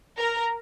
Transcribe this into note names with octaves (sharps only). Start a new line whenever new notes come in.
A#4